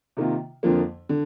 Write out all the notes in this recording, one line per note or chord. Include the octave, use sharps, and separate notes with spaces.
C3 D#3 A#3 F4
F2 D3 F3 A#3
D3